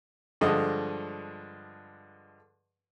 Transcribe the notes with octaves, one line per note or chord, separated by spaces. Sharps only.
G2 D3 F3 G#3 D#5